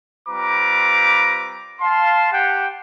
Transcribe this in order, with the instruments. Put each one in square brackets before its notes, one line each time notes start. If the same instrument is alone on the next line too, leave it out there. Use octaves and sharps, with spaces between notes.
[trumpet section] G3 C4 F4 B4 A#5 D6
F5 A5 C6
G4 F#5 G5